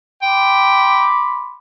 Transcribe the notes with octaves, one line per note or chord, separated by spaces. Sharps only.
G5 B5 C6 D6